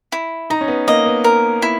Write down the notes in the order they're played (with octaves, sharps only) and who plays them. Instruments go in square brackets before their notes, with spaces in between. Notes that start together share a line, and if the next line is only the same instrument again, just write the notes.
[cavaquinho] E4
[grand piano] D#4 [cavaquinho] A#5
[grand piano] C#4
B3
[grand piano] A#3 [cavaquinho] D#5
[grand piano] B3
[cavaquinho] A#4
E4